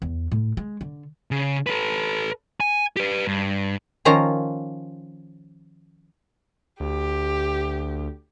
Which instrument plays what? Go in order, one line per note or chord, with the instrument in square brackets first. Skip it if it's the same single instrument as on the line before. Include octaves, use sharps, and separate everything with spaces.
[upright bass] E2
A2
G#3
D3
[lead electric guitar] C#3
A4 B4
G#5
G4 B4
G2
[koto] D#3 F3 C#4 F4 A#5
[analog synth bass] D2 [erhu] G4